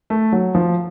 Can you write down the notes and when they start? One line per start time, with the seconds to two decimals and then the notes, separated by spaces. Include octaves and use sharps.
0.10 A3
0.32 F#3
0.55 F3